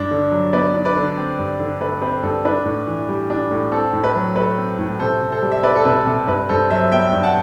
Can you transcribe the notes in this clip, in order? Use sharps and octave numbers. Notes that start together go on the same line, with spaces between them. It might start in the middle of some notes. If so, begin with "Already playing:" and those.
Already playing: G2 D4
D3
F#3
B3 B4 D5
D4
B4 D5
D3
C4
G2
D3
A3 B4
C4 B4
G2 A4
D4 B4
A2
E3
G3
D4
A2
C4 A4
A2
B4
F#3
A3 B4
C4
A2
C3 A4 C5
C3
A4 C5
G3
E5
C4 B4 D5
A4
C3 B4
C3 A4
G2 B4
G2 A4 C5
F#3 C5 E5
B3 E5 G5
G2
F#5 A5